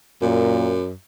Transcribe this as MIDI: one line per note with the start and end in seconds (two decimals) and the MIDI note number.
0.22 0.92 42
0.22 0.77 46